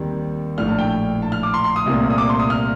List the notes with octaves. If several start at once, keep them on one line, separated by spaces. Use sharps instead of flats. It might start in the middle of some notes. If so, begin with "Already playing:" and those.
Already playing: D#2 D#3 G3 C4
A#1 A2 A3 D4 F6
A5
G5
A5
F6
D6
C6
C6
D#6
C2 A#2 A3 C4
D#6
D6
C6
D#6
F6